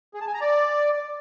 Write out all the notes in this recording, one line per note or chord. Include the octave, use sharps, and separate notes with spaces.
G#4
A5
G#5
A#5
D5